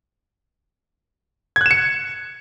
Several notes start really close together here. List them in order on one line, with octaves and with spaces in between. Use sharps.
G#6 F#6 E7 C#7